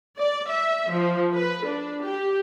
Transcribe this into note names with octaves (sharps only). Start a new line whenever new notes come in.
D5
E5
F3
B4
D4
G4